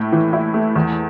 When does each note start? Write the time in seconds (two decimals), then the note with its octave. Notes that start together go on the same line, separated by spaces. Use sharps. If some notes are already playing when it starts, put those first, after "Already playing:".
Already playing: A2 A3 E4
0.12 E3
0.33 E4
0.54 A3
0.76 E2